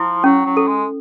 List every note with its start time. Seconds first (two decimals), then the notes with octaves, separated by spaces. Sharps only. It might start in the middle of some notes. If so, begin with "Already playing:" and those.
Already playing: F3 E4
0.24 F#3 C#4
0.45 F#3
0.57 A4
0.67 G#3